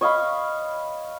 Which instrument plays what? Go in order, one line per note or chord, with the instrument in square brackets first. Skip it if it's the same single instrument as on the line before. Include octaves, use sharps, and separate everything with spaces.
[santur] C#5 D#5 F5 B5